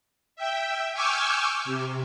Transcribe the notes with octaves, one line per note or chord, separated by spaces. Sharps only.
E5 G5
G#5 C#6 D6 E6 F6 G6
C3